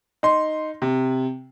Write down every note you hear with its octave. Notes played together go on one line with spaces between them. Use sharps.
D#4 C6
C3